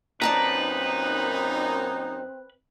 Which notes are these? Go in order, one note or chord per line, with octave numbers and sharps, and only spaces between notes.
F#2 A#2 C4 D#4 B4 D5 A5 A#5